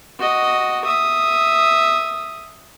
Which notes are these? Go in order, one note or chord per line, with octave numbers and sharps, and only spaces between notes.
F#4 D#5
E5 D#6